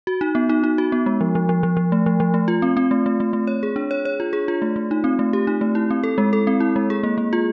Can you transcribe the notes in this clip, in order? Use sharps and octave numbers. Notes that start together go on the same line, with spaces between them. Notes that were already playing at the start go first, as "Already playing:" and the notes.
F#4
D#4
B3
D#4
D#4
F#4
B3
G#3
F3
F3
F3
F3
F3
A3
F3
F3
A3
F4
C4
C4
A3
A3
A3
A3
C#5
G#4
D4
C#5
C#5
F4
G#4
F4
A3
A3
D#4
C4
A3
G4
D#4
A3
E4
C4
A4
G#3
A4
C4
E4
G#3
G#4
A#3
A#3
F4